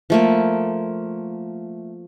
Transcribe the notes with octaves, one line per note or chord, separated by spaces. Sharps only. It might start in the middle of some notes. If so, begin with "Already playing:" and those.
F3 A3 A#3